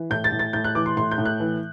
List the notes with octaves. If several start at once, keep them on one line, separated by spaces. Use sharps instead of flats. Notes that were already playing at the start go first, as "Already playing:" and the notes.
Already playing: E3
A2 G6
A6
A2
A6
A2 G6
F#6
E3 D6
C6
A2 C6
G6
A2
F#6
E3